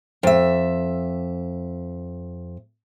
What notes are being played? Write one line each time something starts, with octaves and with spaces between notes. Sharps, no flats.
F2 E5